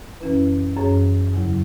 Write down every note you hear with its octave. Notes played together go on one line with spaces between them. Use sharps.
F#2 E3 C#4 E4 B4
F#2 E3 C#4 G#4 C#5
E2 C#3 F#3 E4